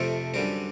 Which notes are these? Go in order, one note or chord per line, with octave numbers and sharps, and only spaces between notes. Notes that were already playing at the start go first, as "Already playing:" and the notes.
Already playing: F2 C3 F3 A3 C4 A4
F#2 D3 G3 C4